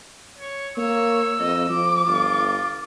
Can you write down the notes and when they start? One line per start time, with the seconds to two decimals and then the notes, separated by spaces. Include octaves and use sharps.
0.38 C#5
0.77 A#3 C#5 E6
1.40 F2 D#5
1.70 F3 D6
2.07 G1 F4